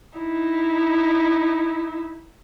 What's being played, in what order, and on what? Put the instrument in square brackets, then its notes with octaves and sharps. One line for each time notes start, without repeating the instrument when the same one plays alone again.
[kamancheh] D#4 E4